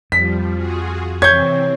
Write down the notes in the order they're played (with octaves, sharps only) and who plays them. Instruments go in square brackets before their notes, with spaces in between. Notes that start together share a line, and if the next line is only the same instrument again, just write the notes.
[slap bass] F2 [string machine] F3 G3 [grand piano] B6
[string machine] F4 F#4 G#4
[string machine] C3 E3 C4 [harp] C#5 [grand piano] G6 G#6